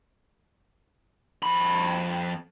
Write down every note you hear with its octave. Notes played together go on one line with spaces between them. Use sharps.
F2 B5